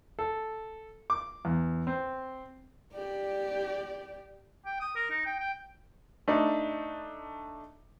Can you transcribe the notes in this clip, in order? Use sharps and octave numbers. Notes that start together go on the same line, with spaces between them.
A4
D6
E2
C4
G4 D5
G5
D#6
A#4
D#4
G5
G5
A3 D4 D#4